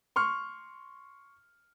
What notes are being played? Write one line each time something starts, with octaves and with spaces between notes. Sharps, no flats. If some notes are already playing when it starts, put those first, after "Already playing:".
C6 C#6 F6